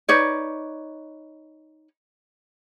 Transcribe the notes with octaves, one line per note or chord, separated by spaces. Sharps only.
D#4 B4 C#5 D5